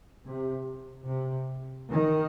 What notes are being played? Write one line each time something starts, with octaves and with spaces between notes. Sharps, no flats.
C3
C3
D#3